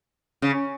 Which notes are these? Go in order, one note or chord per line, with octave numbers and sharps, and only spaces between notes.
C#3